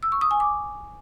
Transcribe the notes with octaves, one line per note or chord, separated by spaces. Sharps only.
E6
C#6
D#6
G#5
D6